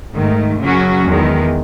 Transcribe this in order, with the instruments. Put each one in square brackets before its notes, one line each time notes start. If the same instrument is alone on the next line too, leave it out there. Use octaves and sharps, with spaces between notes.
[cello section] G#2 D#3 A3
F#2 C#3 F#3 C#4 F#4
E2 D#3 G#3